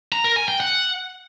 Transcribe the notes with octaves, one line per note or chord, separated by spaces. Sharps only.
A#5
A#4
G#5
G5
F#5